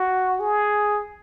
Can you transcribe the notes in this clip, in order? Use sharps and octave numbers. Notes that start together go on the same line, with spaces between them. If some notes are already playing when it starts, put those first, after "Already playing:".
Already playing: F#4
G#4